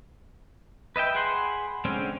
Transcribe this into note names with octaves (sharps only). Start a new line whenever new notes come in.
B4 D#5 E5 G5
G#4 F#5 B5 C6
D3 G#3 C4 C#4